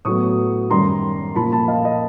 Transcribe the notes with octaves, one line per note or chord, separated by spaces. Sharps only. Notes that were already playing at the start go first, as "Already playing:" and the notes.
A2 F#3 B3 C#6 D#6
F#2 D#3 G3 A#5 C6
A#2 F3 A#3 A5 B5
A5 B5
D#5 F5
D#5